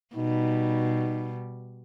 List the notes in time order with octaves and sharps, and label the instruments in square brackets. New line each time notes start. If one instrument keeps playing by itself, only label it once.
[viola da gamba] B2 G3 [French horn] D#4